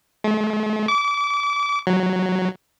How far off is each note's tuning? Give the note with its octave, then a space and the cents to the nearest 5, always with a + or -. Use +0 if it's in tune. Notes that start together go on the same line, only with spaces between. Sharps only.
A3 -45
D6 -30
F#3 +0